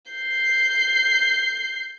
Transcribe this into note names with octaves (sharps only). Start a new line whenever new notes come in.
G6 C7